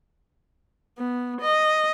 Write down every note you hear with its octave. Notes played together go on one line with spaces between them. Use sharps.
B3
D#5